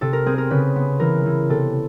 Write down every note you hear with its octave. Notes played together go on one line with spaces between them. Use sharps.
C3 A4
A#4
C4 G#4
A#4
C#3 B4
B3
E3 A#4
E3
C3 A4